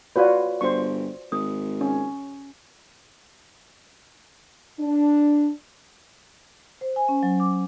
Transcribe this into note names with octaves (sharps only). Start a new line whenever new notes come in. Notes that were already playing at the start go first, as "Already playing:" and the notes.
F4 F#4 B4 C#5 D5
G1 C5 C#6
G#1 D#6
C#4
D4
C5
G#5
C#4
F#3
D6